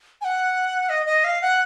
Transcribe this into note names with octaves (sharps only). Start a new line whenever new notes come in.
G#5
F#5
D#5
D#5
F5
F#5